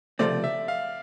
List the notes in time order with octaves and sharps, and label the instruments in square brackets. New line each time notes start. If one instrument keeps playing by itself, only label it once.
[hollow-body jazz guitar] C#2 C3 F3 A3 C4 [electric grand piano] D5
[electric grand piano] E5
F5